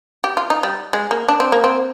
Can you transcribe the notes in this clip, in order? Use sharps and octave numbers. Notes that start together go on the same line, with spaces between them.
G4
F4
D#4
G3
G#3
A#3
D4
C4
A#3
C4